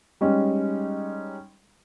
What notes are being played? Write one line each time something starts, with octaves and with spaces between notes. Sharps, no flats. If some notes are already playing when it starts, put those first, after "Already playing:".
G3 G#3 C#4 D#4